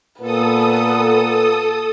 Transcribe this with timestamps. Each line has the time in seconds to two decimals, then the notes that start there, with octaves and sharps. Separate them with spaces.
0.21 A#2 B3 A4 B4 D#6